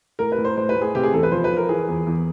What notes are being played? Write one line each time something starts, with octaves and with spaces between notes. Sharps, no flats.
A2 A#4
B4
A2
C5
A2 C5
B4
A2
G#4
C3 G4
G#4
E2 A4
B4
F3 C5
B4
F3
A#4
E3 G#4
E2
E2